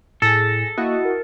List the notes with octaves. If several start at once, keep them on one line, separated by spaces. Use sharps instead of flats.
A2 G#4 A4 A#6
A#3 E4 F#4 D#5
A#4